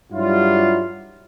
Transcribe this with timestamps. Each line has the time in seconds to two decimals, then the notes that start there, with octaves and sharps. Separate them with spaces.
0.12 G2 F#3 G3 E4 F4